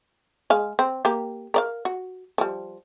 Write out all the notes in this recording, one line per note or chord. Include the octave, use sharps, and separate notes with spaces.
G#3 F5
C4
A#3 G4
A#4 D5 F5
F#4
F3 G3